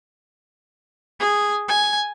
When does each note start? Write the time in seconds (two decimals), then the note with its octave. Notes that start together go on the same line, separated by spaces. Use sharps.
1.20 G#4
1.69 G#5